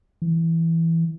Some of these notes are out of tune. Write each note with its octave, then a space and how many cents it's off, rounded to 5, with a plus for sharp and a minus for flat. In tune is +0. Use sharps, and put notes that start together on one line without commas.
E3 +0